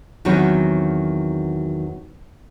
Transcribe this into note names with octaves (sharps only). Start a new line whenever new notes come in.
E2 D#3 F#3 C4 F#4 C#5